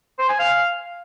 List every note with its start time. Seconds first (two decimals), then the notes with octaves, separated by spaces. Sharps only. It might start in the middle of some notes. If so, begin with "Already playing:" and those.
0.19 C5
0.29 G#5
0.39 F5